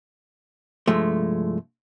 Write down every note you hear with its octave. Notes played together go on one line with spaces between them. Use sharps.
C2 G2 F3 G#3 A3